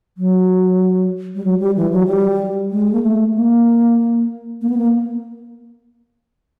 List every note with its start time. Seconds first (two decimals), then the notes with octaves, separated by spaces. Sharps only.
0.18 F#3
1.35 G3
1.44 F#3
1.60 G3
1.76 E3
1.92 F#3
2.07 G3
2.71 G#3
2.93 A#3
3.03 A3
3.34 A#3
4.62 A#3
4.69 B3
4.77 A#3